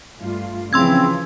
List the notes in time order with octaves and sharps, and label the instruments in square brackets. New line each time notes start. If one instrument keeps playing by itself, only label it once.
[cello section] G2 A3 F4
[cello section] C#3 E3 F3 [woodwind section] C4 [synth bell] C6 E6 G#6